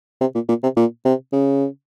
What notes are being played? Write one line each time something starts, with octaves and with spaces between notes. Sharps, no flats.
C3
A#2
A#2
C3
A#2
C3
C#3